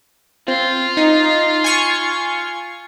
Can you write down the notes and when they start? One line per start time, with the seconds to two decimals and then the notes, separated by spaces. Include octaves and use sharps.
0.48 C4 F4
0.97 D#4
1.64 G#5 C#6 F6